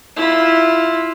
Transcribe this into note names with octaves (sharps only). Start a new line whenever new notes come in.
E4 F4